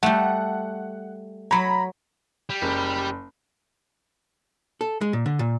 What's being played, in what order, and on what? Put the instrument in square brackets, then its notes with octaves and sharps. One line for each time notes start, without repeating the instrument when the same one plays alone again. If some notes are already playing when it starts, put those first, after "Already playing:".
[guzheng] G3 A3 [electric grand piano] F#5
[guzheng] F#3 C#5 [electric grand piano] A#5 B5
[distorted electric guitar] G3
[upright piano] F#1
[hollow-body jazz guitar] A4
G#3
A#2
D3
A#2